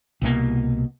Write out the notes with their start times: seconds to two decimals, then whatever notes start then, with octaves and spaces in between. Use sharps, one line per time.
0.22 C2 B2 A#3